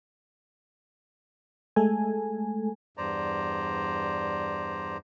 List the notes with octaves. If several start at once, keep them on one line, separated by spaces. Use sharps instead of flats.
G#3 A3 A4 G#5
E2 G2 C5 D5 A#5